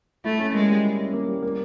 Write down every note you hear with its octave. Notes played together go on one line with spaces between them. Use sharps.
A3 E4
C#4
G#3 A#3
G3
E4
C#4
A#3
G3
A#3